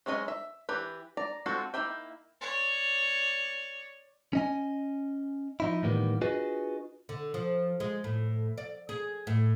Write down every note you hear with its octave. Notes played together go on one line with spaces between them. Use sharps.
F#3 G#3 C#4 E4 D#5
E5
E3 G4 B4
D5 A#5
G#3 C4 F4 F#4 A4
A#3 D#4 E4 E5 G5
C#5 D5
C#4 D#5 G#5
F3 D#4 E4
A2 D#3 E3 G3 A#3 B3
D4 F4 F#4 G#4 B4 D#5
D3
F3
G#3
A2
D5
G#4
A2